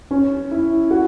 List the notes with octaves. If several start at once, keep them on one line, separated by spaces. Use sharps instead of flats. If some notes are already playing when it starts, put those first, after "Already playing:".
C#4
E4
F#4